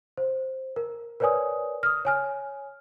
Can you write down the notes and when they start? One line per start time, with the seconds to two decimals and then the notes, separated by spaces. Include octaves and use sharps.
0.17 C5
0.76 A#4
1.20 A#4 B4 C#5 D5 G#5 D#6
1.83 D#6 F6
2.05 C#5 G#5 F6